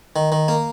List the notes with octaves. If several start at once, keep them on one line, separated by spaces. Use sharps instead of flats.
D#3
D#3
A#3